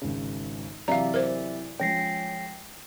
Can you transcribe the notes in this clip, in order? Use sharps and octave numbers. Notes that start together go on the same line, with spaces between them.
G#1 C#3
C3 E3 F#3 D5 E5 F5 A#5
A#4 C5
F3 G#3 C#4 G5 A#6 C7